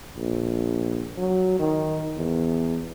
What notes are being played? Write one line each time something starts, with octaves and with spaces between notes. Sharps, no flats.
A#1
F#3
D#3
E2